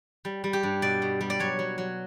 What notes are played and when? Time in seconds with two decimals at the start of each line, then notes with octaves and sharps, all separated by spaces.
0.25 G3
0.44 G3
0.53 G4
0.63 G2
0.82 B2 D5
1.02 B2
1.21 G3
1.30 D5
1.40 F#3 C#5
1.59 F#3
1.78 F#3